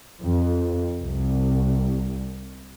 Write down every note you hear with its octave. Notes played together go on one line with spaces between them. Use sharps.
F2
C2